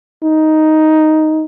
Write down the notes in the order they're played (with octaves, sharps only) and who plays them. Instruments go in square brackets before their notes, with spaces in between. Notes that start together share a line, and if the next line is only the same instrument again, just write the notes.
[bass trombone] D#4